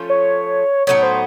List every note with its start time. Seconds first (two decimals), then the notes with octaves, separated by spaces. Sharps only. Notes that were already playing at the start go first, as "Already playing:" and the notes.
Already playing: F3 A3 C#4 F4
0.09 C#5
0.87 A2 F#3 B3 D#4 C#5
1.03 C5